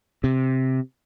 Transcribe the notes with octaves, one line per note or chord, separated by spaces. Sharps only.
C3